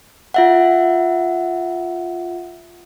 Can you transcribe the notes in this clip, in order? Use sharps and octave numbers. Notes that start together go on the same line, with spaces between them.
F4 E5 F#5